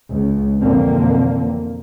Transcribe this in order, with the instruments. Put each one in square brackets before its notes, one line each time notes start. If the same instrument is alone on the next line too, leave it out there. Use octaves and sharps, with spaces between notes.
[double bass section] C#2
F2 B2 D3 E3 A#3 C4